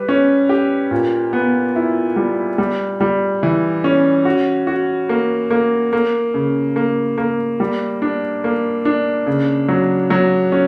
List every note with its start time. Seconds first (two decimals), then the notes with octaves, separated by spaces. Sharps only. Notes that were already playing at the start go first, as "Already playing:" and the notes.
Already playing: G3 B4
0.09 C#4
0.49 G4
0.91 A#2
1.33 B3
1.76 E4
2.16 G3
2.58 G3
3.01 G3
3.43 E3
3.84 C#4
4.25 F#4
4.67 F#4
5.09 A#3
5.51 A#3
5.93 A#3
6.34 C#3
6.76 A#3
7.18 A#3
7.60 G3
8.02 D4
8.44 A#3
8.85 D4
9.27 C#3
9.69 F#3
10.10 F#3
10.52 C#4